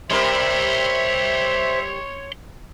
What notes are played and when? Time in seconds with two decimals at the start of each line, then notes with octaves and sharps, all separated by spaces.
0.10 G3 C4 A#4 C5 C#5 E5 C6